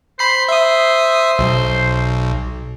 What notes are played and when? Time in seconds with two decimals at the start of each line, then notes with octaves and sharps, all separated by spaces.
0.19 C5 B5 C7
0.49 E5 D#6
1.39 B1